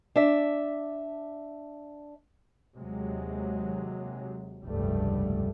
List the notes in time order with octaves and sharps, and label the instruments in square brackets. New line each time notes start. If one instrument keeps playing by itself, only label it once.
[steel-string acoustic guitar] D4 E5
[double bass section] D#2 C3 F#3 G#3
F1 C#2 G2 G3 A3